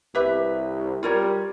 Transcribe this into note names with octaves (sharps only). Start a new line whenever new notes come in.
C2 G4 B4 E5
G3 F4 A#4 C#5